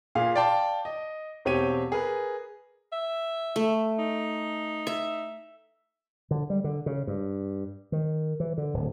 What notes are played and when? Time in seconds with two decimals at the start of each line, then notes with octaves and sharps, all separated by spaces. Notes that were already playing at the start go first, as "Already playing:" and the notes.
0.15 A#2 G#4 F5
0.36 D5 F5 G5 A5 C6
0.85 D#5
1.45 E1 C4 G4 C#5 D#7
1.92 G#4 A#4 B4
2.92 E5
3.56 A3
3.98 D#4
4.87 E5
6.31 D3
6.50 G3
6.64 D3
6.86 C#3
7.07 G2
7.92 D#3
8.40 E3
8.58 D3
8.74 D1